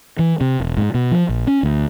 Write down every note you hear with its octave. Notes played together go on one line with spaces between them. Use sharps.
E3
C3
E1
G#2
B2
F3
A#1
C#4
D2